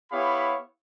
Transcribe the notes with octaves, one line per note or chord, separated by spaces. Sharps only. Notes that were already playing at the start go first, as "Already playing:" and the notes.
B3 E4 G4 C#5 F5 B5